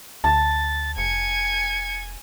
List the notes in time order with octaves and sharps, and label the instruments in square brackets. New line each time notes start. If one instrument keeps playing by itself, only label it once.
[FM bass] D2 [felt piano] A5 [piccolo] A6
[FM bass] F1 [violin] G#5 G#6 [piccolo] C#7